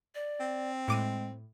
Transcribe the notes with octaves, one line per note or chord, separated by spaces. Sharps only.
D5
C4
A2 G#3 D6 D#7